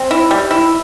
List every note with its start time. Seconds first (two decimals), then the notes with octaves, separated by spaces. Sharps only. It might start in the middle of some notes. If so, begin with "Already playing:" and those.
Already playing: C4
0.11 E4
0.31 G3
0.51 E4